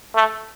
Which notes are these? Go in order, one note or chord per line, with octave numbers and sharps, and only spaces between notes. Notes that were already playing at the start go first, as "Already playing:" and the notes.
A3